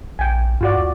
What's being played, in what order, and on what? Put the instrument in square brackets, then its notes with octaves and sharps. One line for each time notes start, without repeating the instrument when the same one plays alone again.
[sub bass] A#1 [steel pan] G5 G#5
[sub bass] G2 [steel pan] F4 F#4 D5
[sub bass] D#2